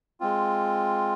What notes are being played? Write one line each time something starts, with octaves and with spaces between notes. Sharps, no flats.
G#3 C4 F4